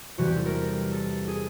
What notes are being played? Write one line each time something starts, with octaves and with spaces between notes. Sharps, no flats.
E2 C3 E3 G3 F#4
G4
A4
A#4
A4
G#4